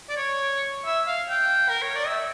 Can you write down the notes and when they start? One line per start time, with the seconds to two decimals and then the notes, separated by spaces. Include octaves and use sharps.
0.10 D5
0.17 C#5
0.85 E5
1.07 F5
1.30 G5
1.69 A#4
1.82 C#5
1.96 D5
2.08 E5